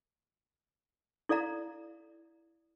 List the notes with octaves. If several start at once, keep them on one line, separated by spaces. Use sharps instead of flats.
E4 A4 D5 F5 A#5